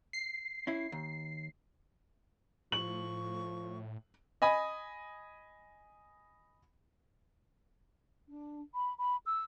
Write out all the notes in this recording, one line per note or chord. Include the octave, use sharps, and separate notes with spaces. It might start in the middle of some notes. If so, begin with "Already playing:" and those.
C7
C#4 E4
D#2
A2 F3 C#6 F#7
D#5 G#5 B5 D#6
D4
B5
B5
E6